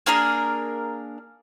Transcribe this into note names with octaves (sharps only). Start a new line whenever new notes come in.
A#3 D4 G#4 A#4